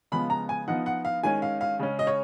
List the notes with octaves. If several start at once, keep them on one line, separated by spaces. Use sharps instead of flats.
C#3 F3 G#3 B3 B5
A#5
G#5
F3 B3 D#4 F#5
F#5
F5
D#3 G#3 C#4 G#5
F5
F5
C#3 G#3 C#4
D#5
C#5